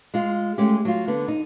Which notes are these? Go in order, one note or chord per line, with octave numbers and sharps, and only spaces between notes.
G#3 F4
G#3 A3 C#4 G4
F#3 F4
D3 B3
D#4